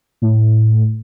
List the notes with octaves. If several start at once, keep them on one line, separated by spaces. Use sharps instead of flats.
A2